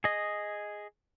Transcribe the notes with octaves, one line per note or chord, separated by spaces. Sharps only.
G#4 D#5